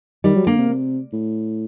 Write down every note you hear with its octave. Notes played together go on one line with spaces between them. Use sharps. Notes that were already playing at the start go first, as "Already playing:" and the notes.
D#3 G3
F#3
D3 A#3
C3
C3
A2